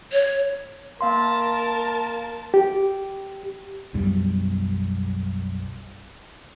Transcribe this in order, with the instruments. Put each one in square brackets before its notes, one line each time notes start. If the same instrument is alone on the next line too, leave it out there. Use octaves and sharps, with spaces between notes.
[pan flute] C#5
[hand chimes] A#3 F5 C6 [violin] A#4 A5
[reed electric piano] G4
[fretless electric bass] B1 F#2 G3